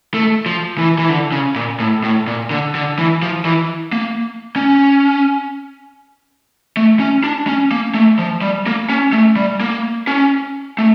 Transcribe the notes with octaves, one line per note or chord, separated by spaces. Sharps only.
A3
F3
E3
E3
D3
C#3
A#2
A2
A2
A#2
D3
D3
E3
F3
E3
A#3
C#4
A3
C#4
D4
C#4
A#3
A3
F3
G3
A#3
C#4
A3
G3
A#3
C#4
A3